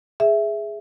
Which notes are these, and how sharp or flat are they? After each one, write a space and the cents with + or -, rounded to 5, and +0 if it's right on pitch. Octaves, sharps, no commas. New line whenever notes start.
G#4 +0 E5 +0